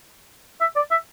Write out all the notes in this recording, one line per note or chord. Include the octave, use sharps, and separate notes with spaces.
E5
D5
E5